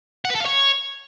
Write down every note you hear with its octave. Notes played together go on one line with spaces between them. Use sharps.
F#5
B4
A4
F5
C#5